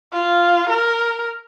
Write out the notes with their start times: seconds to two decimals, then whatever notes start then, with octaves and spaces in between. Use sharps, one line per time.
0.13 F4
0.70 A#4